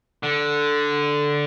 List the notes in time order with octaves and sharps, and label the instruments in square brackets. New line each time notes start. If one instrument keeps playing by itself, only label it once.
[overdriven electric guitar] D3